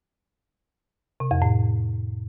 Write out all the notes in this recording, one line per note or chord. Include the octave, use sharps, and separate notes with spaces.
C3
F2
A2